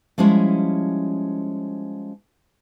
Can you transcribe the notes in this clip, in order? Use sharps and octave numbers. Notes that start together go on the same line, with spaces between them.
F3 G3 G#3 C#4 E4 C#5